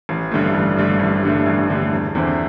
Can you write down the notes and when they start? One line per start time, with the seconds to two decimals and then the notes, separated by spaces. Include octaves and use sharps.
0.09 A1
0.31 G2 D3 A3
0.54 A1
0.77 G2 D3 A3
0.99 A1
1.23 G2 D3 A3
1.46 A1
1.69 G2 D3 A3
1.91 E1
2.15 E2 D3 C4 E4